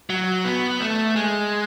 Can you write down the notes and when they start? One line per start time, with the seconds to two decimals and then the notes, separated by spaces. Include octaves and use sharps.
0.10 F#3
0.45 B3
0.80 A3
1.16 G#3